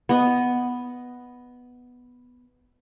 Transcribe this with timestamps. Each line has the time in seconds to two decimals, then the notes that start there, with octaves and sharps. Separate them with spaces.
0.09 B3 D#5